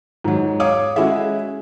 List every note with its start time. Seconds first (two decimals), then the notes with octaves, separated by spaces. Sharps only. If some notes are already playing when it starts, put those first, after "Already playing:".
0.24 G#2 F#3
0.60 C#5 F5 D6 D#6
0.96 G#3 C#4 E4 F#4 G#4 E5